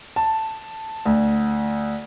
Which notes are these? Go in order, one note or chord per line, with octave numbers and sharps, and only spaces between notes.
A5
D2